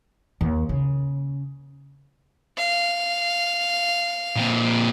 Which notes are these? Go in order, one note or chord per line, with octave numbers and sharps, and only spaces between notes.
D#2
C#3
F5
A#2 C4